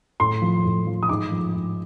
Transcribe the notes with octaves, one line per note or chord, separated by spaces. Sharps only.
A2 C6
F3
A2
F3
D#6
G#2 D6
F3
G#2